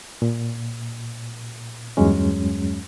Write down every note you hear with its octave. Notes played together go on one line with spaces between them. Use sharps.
A#2
E2 G2 F#3 G#3 C#4